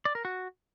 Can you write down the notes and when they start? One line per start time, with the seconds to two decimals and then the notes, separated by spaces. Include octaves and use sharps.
0.05 D5
0.15 A#4
0.25 F#4